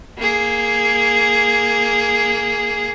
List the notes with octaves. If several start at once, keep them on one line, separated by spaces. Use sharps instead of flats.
A#3 G#4